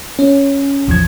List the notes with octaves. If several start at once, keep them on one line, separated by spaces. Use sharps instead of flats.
C#4
A#1 E2 F3 G#6